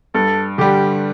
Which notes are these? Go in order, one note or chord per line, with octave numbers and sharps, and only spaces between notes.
G2 A4
D3 G3 G4